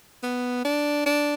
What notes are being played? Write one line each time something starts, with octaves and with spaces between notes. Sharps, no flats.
B3
D4
D4